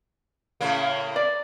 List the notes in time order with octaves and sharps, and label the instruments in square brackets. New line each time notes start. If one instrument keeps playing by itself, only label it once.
[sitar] A2 C#3 A#3
[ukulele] D5